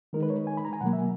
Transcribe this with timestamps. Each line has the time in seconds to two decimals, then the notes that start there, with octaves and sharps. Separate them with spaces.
0.13 D#3 G#3 D#4 A#4
0.23 B4
0.30 C#5
0.47 G#5
0.57 B5
0.65 A#5
0.73 G#5
0.81 B2 F#3 A#3 F#5
0.93 E5